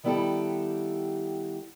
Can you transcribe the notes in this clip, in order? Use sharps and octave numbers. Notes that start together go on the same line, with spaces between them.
D#3 G3 B3 E4 G4 A4